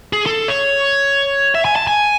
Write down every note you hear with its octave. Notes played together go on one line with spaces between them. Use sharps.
G#4
A4
C#5
E5
G#5
A5
G#5